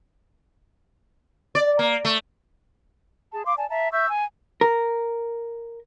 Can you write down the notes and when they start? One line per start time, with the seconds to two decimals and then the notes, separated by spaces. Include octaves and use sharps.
1.55 D5
1.79 A#3
2.05 A3
3.33 G#4 A5
3.45 F5 C6 D6
3.57 D5 G#5 A5
3.70 E5 F5 A5 A#5
3.92 E5 C#6 E6 G6
4.08 G#5
4.61 A#4